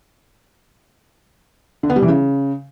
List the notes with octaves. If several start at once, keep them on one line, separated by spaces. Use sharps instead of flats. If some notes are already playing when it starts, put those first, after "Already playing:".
D3
B3
G3
E3
C#3